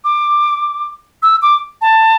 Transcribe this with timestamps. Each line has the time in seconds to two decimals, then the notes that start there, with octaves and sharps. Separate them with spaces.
0.04 D6
1.23 E6
1.42 D6
1.81 A5